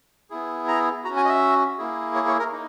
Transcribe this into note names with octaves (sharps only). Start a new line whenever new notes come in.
B3 E4 G#4
A#5
C#4 F#4 A#5
G#5
D#5
E5
A#3 E4 G#4
C#5
C#5
A#4
A#3 D#4